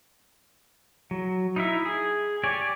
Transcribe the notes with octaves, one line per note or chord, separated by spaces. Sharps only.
F#3
D#4 E4 E5
G#4
G4 C#5 D5 G#5